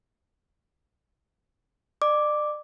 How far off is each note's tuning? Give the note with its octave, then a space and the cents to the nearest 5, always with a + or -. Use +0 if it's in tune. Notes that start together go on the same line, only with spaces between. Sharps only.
D5 +35 D6 +0